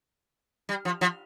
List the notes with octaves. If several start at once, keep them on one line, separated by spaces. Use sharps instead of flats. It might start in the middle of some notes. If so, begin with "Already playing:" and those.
G3
F3
F3